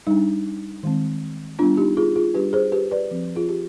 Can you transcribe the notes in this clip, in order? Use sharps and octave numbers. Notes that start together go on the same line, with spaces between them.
G3 D4 D#4
D#3 G#3 C4
G3 B3 D4 F4
D#4 G4
F4 G#4
F4 G#4
G3 D4 G4 B4
G#4 C5
G4 B4
B4 D5
F3 C4
F4 G#4
G4